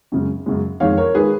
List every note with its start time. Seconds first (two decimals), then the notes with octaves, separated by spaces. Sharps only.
0.12 F#2 C#3 G#3
0.46 F#2 C#3 G#3
0.80 F2 D#3 G#3 C#5 F5
0.97 A#4 C#5
1.15 D#3 G#3 G#4 B4